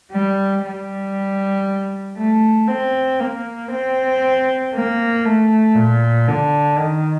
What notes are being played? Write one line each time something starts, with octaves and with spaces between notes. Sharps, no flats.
G3
G3
A3
C4
A#3
C4
A#3
A3
A#2
D3
D#3